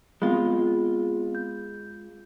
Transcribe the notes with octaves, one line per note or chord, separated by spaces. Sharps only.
G#3 B3 C4 F4 B5
G6